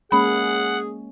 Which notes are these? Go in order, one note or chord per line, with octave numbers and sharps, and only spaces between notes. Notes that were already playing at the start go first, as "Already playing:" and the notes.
G#3 A#3 C#4 G#4 F#5 B5